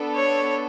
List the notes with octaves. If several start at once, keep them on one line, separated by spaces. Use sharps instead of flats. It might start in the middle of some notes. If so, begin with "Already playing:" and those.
Already playing: B3 D4 A4
C#5